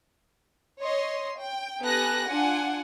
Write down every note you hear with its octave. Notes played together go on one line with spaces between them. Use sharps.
C#5 D#5 C6
G5
B3 G4 A4 G#5 F#6 A#6
D4 F4 F#5 G#5